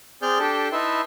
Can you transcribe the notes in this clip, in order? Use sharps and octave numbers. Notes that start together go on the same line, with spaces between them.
C4 G#4 D5 F6 G6
D4 G4 A4 G5 A5
D#4 E4 B4 E5 A5 C6